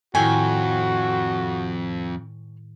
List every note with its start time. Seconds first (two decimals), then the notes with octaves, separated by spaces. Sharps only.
0.15 F2 A2 D#3 E4 F#4 C#5 G5 G#5